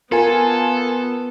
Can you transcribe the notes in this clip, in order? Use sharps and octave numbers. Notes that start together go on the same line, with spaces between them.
B3 F4 A4 A#4 G#5